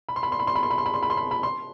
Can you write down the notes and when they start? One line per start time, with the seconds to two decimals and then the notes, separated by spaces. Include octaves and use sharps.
0.09 B5
0.16 C6
0.23 B5
0.32 C6
0.39 B5
0.47 C6
0.55 B5
0.63 C6
0.70 B5
0.78 C6
0.86 B5
0.94 C6
1.03 B5
1.10 C6
1.17 B5
1.31 B5
1.43 C6